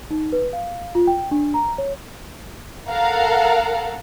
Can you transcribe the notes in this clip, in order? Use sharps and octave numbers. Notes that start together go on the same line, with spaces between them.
D#4
B4
F5
F4
G5
D4
A#5
C#5
A4 A#4 F5 F#5 A#5